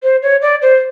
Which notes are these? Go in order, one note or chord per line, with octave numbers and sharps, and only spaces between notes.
C5
C#5
D5
C5